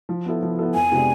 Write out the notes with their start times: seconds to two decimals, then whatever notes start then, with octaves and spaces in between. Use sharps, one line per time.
0.09 F3
0.26 B3 E4 A4
0.43 F3
0.59 B3 E4 A4
0.74 F2 G#5
0.92 C3 G#3 B3 D4